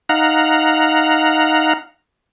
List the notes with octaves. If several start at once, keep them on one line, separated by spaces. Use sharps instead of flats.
D#4 F5 F#5 A#5